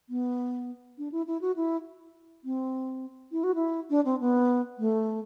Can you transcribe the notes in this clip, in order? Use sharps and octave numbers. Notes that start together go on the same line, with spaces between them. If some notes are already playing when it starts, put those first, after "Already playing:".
B3
D4
E4
E4
F#4
E4
C4
E4
F#4
E4
D4
C4
B3
A3